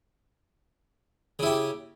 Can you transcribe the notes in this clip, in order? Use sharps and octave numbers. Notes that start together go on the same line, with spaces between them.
C#3 E4 G4